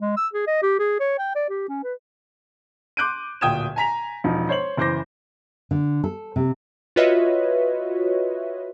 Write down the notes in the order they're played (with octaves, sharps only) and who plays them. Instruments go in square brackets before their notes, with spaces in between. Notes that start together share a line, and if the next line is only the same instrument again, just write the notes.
[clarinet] G#3
E6
G#4
D#5
G4
G#4
C#5
G5
D5
G4
C#4
B4
[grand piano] C6 D6 F#6 G6 D7 D#7
D1 A#2 G5 D#6 G#6 E7
G#5 A#5 B6 F7
E1 F3 D#4
C5 C#5 C6 F#7
F#1 E3 C5 D6 G6 A#6
[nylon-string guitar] D3
A4
C3
[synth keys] F4 F#4 B4 C#5 D#5 E5